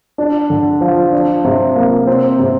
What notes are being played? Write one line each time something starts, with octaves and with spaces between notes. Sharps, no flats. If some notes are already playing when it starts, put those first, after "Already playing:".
D4
D3
F3
D4
C3
A#3
C4
C3